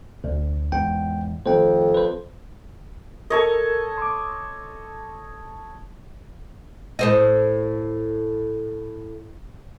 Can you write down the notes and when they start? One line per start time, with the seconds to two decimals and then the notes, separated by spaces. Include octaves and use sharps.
0.24 D2
0.72 E2 G#2 G5
1.46 F2 D#3 A3 C5 G5
1.94 B4 C5
3.30 A4 A#4 C#5 D#5
3.98 C6 D6
6.99 A2 C5 D#5